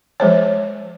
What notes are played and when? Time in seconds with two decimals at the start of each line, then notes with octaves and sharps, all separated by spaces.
0.20 F3 G#3 C5 C#5